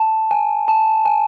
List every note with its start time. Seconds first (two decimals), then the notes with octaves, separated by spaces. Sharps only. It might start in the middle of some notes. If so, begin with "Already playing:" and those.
Already playing: A5
0.31 G#5
0.68 A5
1.05 G#5